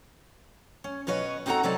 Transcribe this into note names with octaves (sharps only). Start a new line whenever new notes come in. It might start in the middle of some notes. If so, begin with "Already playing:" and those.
C#4
B2 C#4 B4 C#5 D#5
C4 D#4 F#4 A4 F#5 A#5
C3 F#3 A4 D5 D#5 A5